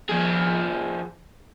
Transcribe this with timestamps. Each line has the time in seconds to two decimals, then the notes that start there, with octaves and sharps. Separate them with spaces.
0.09 F3 G#4